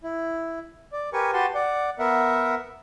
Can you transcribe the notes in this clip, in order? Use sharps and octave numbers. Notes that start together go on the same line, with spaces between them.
E4
D5
G4 A#4 B4 G#5 C#6
F#4 G4 B4 F#5 A5 C6
D5 F#5
B3 A#4 E5 F#5